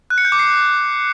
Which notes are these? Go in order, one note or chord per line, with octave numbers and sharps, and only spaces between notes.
F#6
C#7
G6
D6
C7